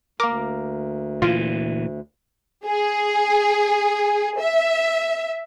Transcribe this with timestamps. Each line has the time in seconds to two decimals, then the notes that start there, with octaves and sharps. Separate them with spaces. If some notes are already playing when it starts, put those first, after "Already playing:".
0.20 D2 A#3 A#4 D6
1.22 A#2 E3 F4
2.65 G#4
4.39 E5